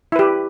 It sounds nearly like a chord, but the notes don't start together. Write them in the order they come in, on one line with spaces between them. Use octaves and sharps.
E4 B4 G4